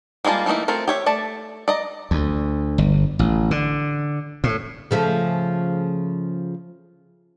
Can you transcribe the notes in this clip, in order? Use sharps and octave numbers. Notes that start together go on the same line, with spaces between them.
G3 G#3 A#3 F4 A5
E3 A3 A#3 D#4 E4
A3 C4 F4 A#4
G4 C#5 E5
A3 D5 A5
D5 D#5 A#5
D2
G1
A1
D3
A2
C#3 F3 A3